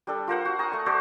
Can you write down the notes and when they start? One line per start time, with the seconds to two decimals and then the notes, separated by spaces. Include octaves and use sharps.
0.07 G3 D4 A4
0.27 F4 A#4 C5 F#5
0.45 F#4
0.59 G#5 A#5 C#6 D#6
0.72 A3 C#6
0.86 F#4 A4 C5 D5